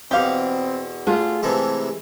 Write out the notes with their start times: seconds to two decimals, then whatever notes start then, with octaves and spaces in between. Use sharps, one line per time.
0.11 E2 B2 C4 G4 F5
1.07 A3 D4 F4 G#4
1.43 C3 E3 G#3 A4